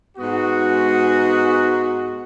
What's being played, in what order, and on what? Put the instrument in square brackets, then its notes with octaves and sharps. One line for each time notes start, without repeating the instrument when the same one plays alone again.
[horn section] G#2 G#3 B3 F#4